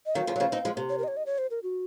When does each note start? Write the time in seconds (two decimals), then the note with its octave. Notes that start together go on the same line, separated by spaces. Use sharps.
0.06 D#5
0.15 D#3 F#3 F5
0.27 C#3 F3
0.36 F#3
0.40 C#3 F3
0.52 C4 D#4
0.65 F3 G#3
0.77 C3
0.89 C#5
0.98 A#4
1.04 D#5
1.08 C#5
1.17 D#5
1.26 C#5
1.38 C5
1.51 A#4
1.63 F#4